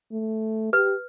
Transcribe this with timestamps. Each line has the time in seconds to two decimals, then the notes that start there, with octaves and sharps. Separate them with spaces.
0.12 A3
0.73 G4 B4